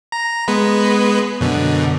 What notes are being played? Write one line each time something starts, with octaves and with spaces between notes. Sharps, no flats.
A#5
G#3 B3 B4
F#2 B2 D3